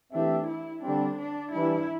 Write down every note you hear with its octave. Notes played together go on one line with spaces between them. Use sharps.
E3 A3 C4 D4 G4 E5
E4
D3 G3 C4 D4
D4
E3 G3 D4 E4